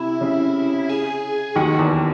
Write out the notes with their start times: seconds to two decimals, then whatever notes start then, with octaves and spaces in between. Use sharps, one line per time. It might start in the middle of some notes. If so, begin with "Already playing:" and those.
Already playing: C3 E4
0.21 C#3
0.89 G#4
1.56 D#2 D#3 F#4
1.79 E2 E3